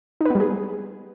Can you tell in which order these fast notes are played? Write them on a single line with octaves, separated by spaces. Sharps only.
D#4 B4 B3 G3 G#4